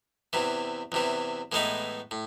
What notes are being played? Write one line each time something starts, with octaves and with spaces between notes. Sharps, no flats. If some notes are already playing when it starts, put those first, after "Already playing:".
E2 C3 E3
E2 C3 E3
A2 E3 G#3 B3 D#4
A2